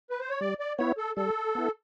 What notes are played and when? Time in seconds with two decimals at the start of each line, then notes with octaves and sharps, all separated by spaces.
0.10 B4
0.20 C5
0.30 C#5
0.41 G3 D5
0.60 D5
0.78 B3 E4 C#5
0.98 A4
1.16 G3 A4
1.55 B3 E4